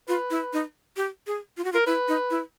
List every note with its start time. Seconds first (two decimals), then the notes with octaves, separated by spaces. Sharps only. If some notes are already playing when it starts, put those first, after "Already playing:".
0.08 F4 B4
0.30 E4
0.53 D#4
0.97 G4
1.27 G#4
1.57 F4
1.64 F#4
1.72 F4 A#4
1.86 E4 B4
2.08 D#4
2.30 E4